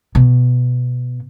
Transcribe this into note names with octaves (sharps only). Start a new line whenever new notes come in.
B2